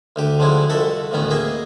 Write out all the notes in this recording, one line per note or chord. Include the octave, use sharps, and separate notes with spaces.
D2 D3 G4
D3 F3 F#3 G#3 E4
C2 F2 F#4 A4 E5
A1 D2 D#3 B3 C#4
A#3 G#4 D#5 E5